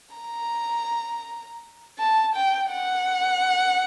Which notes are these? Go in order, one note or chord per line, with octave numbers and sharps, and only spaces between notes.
A#5
A5
G5
F#5